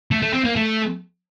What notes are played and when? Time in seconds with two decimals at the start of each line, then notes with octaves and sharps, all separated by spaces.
0.11 A3
0.22 A3
0.34 C4
0.45 A#3
0.56 A3